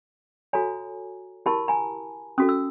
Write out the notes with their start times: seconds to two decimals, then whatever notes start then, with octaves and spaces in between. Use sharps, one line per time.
0.53 F#4 A4 C#5 G#5 A#5
1.46 E4 G4 A#4 A5 B5
1.68 G#5 A#5
2.38 C#4 F#4 A4 D#6
2.49 E6